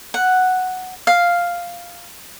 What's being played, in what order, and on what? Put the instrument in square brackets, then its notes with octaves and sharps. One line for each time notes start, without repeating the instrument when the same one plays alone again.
[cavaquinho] F#5
F5